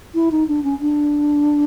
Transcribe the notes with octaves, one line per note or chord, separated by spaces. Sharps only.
E4
D#4
D4
C#4
D4